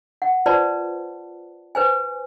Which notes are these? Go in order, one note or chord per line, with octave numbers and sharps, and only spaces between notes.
F#5
F4 B4 C5 D5 A5 C6
B4 C5 G#5